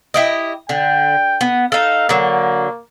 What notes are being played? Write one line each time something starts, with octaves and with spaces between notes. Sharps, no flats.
E4 G4 D#5
D3 G5
B3
D#4 A4 F5
D3 F#3 A#3